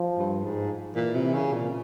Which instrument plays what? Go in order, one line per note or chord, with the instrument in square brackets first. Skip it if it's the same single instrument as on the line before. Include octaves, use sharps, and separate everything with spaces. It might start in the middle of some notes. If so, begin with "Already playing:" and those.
Already playing: [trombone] F3
[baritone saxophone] G2
G#2
[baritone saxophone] A#2 [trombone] E3
[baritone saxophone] C3
C#3
A#2